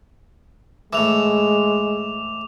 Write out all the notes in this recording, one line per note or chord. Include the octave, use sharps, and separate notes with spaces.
A2 E3 G#3 D6 F7